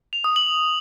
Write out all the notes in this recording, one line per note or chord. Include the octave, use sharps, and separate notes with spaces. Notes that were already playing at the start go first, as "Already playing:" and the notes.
F7
D#6
F#7